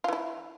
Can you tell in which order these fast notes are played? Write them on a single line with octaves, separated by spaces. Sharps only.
F4 E3 E4